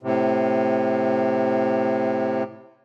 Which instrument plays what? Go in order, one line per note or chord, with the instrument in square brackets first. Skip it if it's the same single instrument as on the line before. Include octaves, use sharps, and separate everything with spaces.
[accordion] A2 C3